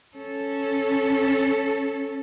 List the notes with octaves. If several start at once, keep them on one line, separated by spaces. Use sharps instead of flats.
C#4 A4